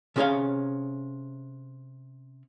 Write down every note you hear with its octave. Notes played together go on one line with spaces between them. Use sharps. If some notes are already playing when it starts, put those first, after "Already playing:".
C3 C#4 G#4 C5 C#5 F5